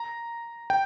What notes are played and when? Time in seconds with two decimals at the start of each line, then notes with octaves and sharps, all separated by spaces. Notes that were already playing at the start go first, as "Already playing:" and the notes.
Already playing: A#5
0.70 G5